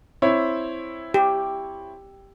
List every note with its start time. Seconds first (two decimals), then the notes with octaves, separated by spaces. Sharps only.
0.22 C4 E4 C#5
1.14 G4